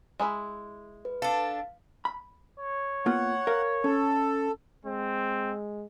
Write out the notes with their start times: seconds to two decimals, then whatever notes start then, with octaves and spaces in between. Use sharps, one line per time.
0.20 G#3 E4 B5
1.05 B4
1.22 D4 A4 F5
2.05 B5
2.59 C#5
3.06 A#3 B3 F4 F#5
3.47 A#4 F5
3.84 C#4 A4
4.86 G#3 C4